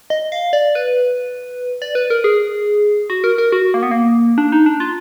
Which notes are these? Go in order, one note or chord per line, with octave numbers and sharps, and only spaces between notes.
D#5
F5
D5
B4
D5
B4
A#4
G#4
F#4
A#4
A#4
F#4
A#3
B3
A#3
D4
D#4
D4
F4